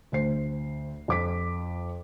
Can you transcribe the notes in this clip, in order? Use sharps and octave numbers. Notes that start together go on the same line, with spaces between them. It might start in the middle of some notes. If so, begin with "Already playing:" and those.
D2 C5 C7
F2 D6 B6